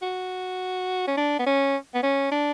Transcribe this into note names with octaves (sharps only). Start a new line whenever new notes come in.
F#4
C#4
D4
B3
C#4
B3
C#4
D4